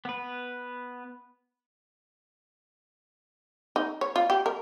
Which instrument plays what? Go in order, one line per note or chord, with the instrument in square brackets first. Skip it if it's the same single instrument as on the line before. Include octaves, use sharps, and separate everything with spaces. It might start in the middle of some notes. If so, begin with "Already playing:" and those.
[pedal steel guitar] B3 B4
[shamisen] D#4
C#5
F4
G4
A#4